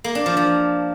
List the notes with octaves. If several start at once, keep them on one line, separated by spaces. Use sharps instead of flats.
A#3
D4
F3
F3